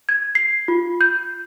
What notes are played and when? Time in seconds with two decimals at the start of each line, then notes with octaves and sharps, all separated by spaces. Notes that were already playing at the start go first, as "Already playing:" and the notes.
0.09 G#6
0.35 C7
0.68 F4
1.01 G6